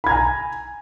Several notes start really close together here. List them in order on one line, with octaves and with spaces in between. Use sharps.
B5 G#6 A#5 G#5